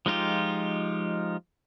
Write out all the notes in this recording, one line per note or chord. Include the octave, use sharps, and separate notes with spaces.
F3 G#3 D#4 F4 G4